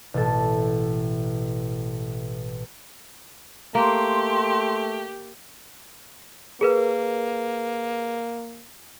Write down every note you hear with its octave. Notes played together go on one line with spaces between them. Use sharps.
A1 B2 A4
A3 A#3 G4 C6
A#3 G#4 A#4 B4